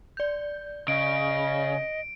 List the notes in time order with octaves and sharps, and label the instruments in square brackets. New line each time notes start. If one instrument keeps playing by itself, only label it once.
[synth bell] D5 G6
[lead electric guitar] C#3 [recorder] D#5 [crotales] D7